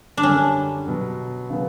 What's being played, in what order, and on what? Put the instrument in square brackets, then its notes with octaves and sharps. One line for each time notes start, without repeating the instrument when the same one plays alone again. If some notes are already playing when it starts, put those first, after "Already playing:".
[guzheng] D4
[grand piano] F#2 D3 G3 [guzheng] C#4
[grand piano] B2 F#3 B3
C#3 F#3 B3